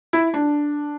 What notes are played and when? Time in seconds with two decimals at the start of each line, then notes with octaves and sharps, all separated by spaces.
0.13 E4
0.34 D4